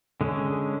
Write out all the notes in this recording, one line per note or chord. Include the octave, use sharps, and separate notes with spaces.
D3 G#3 C#4